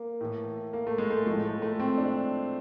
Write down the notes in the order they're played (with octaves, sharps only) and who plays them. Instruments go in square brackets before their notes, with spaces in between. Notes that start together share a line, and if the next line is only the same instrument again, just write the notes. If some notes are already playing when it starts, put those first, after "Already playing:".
Already playing: [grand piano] A#3
A2 E3
A#3
A3
G#3
A3
A2 F3 G#3
A3
A3
C4
D4